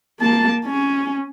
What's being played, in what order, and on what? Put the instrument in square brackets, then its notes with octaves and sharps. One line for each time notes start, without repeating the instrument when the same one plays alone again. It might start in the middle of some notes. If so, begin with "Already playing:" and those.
[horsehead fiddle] A#3 A5
C#4